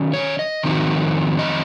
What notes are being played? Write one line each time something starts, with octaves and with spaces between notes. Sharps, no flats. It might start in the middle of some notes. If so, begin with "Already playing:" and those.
Already playing: D#3 F#3 C#4
C#5
D#5
F2 D#3 F#3 C4 D#4
D#5